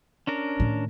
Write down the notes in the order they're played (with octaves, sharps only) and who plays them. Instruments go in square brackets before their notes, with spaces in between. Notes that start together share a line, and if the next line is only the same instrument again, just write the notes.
[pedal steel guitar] C#4 D4 A#4
[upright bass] A2 D#3